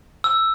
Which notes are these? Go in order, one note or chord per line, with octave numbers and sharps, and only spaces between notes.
E6